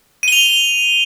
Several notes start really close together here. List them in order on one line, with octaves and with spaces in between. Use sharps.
D#7 G7 F7